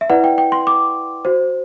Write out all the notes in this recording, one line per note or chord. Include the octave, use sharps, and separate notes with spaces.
E5
E4 B4 D5 F#5
G5
G5
C6
D6
F#4 C5